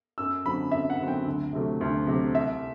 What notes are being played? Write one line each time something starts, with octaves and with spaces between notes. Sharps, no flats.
F#2 E6
D3 F#3 C4 B5
F#2 E5
F#5
D3 F#3 C4
G5
D2
C3 F#3 A3
D2
C3 F#3 A3
C2 E5